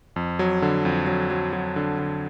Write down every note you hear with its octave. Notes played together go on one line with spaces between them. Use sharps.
F2
F#3
D3
F2
F#3
F#3
F#3
D3
D3